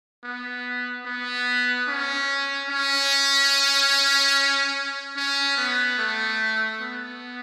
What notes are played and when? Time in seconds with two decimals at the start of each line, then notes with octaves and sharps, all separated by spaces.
0.24 B3
1.06 B3
1.88 C#4
2.70 C#4
5.16 C#4
5.57 B3
5.98 A3
6.80 B3